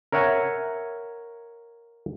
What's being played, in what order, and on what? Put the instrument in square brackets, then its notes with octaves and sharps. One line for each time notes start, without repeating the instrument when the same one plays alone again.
[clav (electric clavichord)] A#4 C#5 E5 F#5 G#5